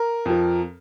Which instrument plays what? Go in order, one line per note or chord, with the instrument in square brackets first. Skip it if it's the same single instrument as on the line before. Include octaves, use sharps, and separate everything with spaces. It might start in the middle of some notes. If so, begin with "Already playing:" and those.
Already playing: [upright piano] A#4
F2 F3